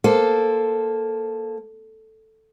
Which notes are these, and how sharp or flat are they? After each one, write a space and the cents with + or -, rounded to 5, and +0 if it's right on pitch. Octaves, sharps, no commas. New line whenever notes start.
A#3 +0 A4 +0 C5 +0